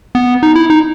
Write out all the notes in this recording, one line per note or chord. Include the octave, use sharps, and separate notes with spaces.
B3
D#4
E4
D#4